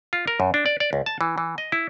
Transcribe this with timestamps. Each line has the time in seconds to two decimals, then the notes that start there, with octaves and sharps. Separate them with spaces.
0.13 F4
0.28 A#4
0.40 F#2
0.54 D4
0.66 D5
0.80 D5
0.93 C#2
1.06 A5
1.21 E3
1.38 E3
1.58 D#5
1.72 E4